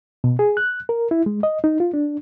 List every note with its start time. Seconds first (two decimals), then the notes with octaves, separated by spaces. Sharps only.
0.24 B2
0.39 G#4
0.57 F#6
0.89 A#4
1.11 E4
1.26 G#3
1.43 D#5
1.64 D#4
1.80 F4
1.94 D4